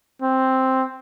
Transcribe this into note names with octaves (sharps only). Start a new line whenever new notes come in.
C4